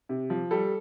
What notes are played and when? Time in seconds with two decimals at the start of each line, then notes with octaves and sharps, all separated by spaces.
0.09 C3
0.30 F3
0.51 G3 A4